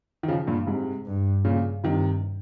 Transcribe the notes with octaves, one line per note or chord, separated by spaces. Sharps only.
D#3
C#3 F3
G2 A#2
G#2 C3
G2
A#2 C#3
G2 C3 D#3